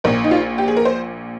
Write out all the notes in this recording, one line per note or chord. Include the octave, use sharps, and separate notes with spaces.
A#1 A#2 A#4
D#4
F4
G4
G#4
A#4
C5